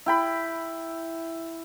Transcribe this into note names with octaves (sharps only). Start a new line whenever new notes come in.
E4 G5 B5